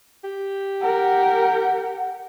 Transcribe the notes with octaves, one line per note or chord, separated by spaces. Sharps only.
G4
A#4 F#5